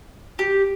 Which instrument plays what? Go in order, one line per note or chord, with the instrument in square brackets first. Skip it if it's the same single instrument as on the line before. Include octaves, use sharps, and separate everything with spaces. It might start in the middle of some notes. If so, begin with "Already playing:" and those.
[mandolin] G4